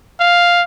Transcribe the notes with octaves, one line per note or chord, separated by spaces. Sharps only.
F5